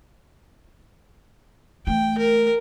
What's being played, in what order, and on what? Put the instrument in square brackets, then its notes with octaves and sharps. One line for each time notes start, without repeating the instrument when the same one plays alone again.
[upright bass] E3 A3 [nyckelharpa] G5
[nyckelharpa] A#4